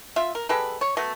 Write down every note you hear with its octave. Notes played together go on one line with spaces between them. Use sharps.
F4 E5
A#4
G#3 G4 A4 B4
C#5
F#3 A3 B3